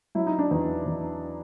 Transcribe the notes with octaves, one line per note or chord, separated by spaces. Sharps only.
F#3 E4
D#4
D4
E2 D#4
E2